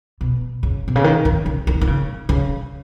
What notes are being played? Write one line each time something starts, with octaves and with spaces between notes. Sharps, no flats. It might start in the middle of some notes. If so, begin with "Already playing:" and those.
B2
C#3
B2
C#3
D#3
D#3
C#3
D#3
D#3
C#3
C#3